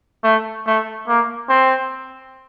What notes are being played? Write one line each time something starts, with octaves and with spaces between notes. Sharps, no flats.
A3
A3
A#3
C4